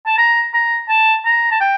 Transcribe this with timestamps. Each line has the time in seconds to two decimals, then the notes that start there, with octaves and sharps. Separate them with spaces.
0.06 A5
0.18 A#5
0.54 A#5
0.89 A5
1.25 A#5
1.51 A5
1.60 G5